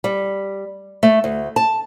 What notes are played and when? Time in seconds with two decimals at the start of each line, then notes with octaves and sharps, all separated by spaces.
0.04 G3
1.03 A3
1.24 D2
1.56 A5